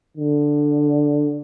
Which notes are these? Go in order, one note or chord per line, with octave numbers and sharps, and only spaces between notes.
D3